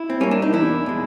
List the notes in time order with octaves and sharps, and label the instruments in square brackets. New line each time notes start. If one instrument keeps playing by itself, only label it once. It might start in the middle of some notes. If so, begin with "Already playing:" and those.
Already playing: [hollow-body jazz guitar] E4
C4
G3 A#3 C#4
D4
D#4
E2 D4 E4
B2 G#3